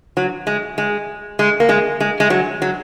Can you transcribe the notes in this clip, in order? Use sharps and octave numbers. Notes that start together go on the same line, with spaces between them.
F#3
G#3
G#3
G#3
A#3
G#3
G#3
G#3
F#3
F#3